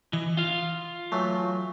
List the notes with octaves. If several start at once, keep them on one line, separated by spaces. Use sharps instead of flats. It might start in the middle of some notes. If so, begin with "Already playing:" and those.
E3 D#5
F4 F5
E3 F#3 A3